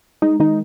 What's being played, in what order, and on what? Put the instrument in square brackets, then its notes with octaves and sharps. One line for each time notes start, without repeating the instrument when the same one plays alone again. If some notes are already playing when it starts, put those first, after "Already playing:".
[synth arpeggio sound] G#3 D#4
D#3 D#4